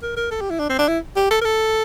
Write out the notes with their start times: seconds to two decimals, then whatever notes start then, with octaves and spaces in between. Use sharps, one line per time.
0.03 A#4
0.17 A#4
0.31 A4
0.41 G4
0.50 E4
0.59 D4
0.70 C4
0.79 D4
0.89 E4
1.16 G4
1.31 A4
1.41 A#4
1.45 A4